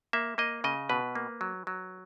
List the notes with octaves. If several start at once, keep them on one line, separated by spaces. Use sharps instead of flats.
A#3 E5
A#3 D#5
C#3 D#5
B2 B4
A#3
F#3
F#3